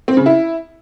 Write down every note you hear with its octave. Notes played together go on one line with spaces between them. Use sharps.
C4
C#3
E4